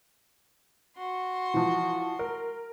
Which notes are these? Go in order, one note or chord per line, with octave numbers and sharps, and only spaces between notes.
F#4 C6
E3 F3
A#4